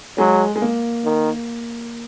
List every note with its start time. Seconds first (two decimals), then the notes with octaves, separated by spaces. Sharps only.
0.18 F#3 G#3
0.56 G#3
0.62 A#3
1.04 D#3